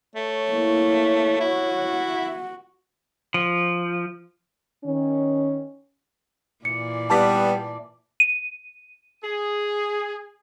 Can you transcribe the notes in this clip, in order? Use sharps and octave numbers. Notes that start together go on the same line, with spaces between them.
A3 C#5
A#3 E4
E4 F#4
F3
D#3 C#4
A#2 E3 D5 C#7
G3 B3 A5 D6 B6
D#7
G#4